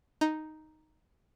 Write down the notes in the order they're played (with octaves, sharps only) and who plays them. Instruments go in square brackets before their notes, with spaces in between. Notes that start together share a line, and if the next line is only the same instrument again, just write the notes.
[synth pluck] D#4